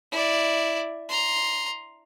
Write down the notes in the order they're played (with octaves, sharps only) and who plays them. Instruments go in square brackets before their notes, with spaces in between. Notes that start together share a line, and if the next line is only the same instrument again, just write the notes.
[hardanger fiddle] E4 D5
A#5 C6